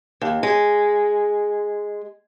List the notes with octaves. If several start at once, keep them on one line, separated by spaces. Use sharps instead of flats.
D#2
G#3